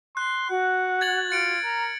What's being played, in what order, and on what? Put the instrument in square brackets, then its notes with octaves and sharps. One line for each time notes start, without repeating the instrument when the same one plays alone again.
[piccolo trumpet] C6 [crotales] F#6
[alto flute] F#4 [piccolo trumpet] F#5
[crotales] G#6 A6 F#7
[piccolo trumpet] F4 [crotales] A6 C#7 D7
[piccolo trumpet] A#4 [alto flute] A#5